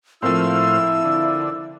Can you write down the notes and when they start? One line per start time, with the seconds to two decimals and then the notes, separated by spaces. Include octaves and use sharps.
0.22 A2 F3 A#3 C4 E4 C5 F5 E6
1.05 D3